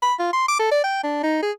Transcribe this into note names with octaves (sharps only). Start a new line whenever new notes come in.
B5
F4
C6
D6
A4
D5
G5
D4
D#4
G#4